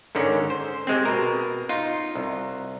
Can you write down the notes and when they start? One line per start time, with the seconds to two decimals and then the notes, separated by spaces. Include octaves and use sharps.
0.15 G#2 D3 D#3 C#4
0.50 C5
0.87 C3 G#3 C4
1.05 B2 A#4
1.69 D#4 F4
2.15 C2